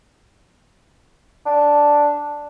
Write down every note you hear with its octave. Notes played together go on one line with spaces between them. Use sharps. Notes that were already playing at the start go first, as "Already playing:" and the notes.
D4